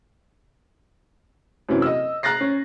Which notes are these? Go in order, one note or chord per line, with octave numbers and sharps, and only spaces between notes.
F#2 C3 E3
D#5 E6
A#5 F#6 A6 A#6 C7
C#4